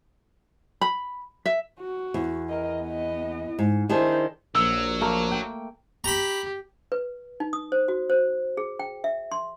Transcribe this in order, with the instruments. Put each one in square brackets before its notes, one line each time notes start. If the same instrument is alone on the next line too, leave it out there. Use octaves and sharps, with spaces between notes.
[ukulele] B5
E5
[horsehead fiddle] F#4
[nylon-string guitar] E2
[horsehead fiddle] A#4 D#5
B3 D#5
[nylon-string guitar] G#2
[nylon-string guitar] D#3 D4 G#4 [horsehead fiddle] E4 C5
[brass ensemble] A#1 [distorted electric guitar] F#3 [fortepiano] E6
[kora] A3 A#3
G5
[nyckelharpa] G4 [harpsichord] A#5 B5
[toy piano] B4
D#4
D#6
C5
F#4
C5
G#4
G5
E5
C6